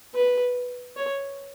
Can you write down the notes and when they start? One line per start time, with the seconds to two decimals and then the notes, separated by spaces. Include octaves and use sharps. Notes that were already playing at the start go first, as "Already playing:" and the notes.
0.15 B4
0.97 C#5